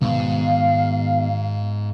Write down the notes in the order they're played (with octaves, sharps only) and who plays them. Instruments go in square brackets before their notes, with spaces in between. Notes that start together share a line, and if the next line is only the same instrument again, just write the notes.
[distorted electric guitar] G#2 [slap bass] B2 D#3 B3 [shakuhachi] F5